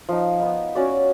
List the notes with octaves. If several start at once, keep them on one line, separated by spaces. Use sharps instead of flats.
F3 D#4
B3 D#4
C#4 F#4 D5